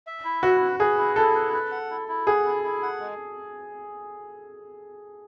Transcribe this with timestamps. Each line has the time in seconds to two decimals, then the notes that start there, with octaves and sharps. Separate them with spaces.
0.07 E5
0.25 E4
0.43 F#4 B4
0.61 B4
0.80 G#4 B4
0.98 E4
1.16 E4 A4
1.35 B4
1.53 B4
1.72 F#5
1.91 E4
2.08 E4
2.27 G#4 F#5
2.45 E4
2.64 E4
2.82 F#5
3.00 G#3